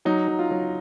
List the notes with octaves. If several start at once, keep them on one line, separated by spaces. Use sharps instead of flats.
F#3 D#4
F#3
F4
F#3